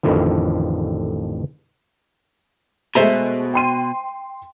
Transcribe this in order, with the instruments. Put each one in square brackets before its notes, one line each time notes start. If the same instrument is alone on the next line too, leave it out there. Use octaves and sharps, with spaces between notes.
[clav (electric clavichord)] A1 F2 A2 D3 D#3 F3
[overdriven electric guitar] B2 [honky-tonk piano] G#3 A3 [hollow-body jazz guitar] C5 E5 A#5
[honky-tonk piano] G5 C6 D#7